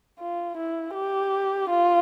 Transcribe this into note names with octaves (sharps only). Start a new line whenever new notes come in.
F4
E4
G4
F4